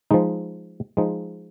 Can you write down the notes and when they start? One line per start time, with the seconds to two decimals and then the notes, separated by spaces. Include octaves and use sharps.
0.11 F3 G#3 D#4
0.97 F3 G#3 D#4